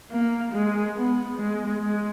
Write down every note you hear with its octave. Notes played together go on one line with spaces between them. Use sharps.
A#3
G#3
B3
G#3
G#3